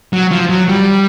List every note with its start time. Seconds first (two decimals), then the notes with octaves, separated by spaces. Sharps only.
0.13 F#3
0.31 F3
0.50 F#3
0.69 G3